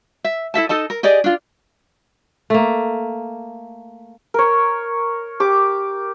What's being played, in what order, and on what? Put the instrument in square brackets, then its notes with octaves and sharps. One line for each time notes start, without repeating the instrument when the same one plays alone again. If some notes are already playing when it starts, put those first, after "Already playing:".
[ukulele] E5
E4 A4 E5 A5
D#4 A4 D#5 A5
A#4
G4 G#4 D5 D#5
D4 F4
[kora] A3 A#3
[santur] A#4 C#5
G4 D6